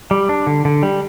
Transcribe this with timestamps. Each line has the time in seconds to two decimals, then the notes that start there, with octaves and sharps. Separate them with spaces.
0.11 G3
0.29 D4
0.47 D3
0.65 D3
0.83 G3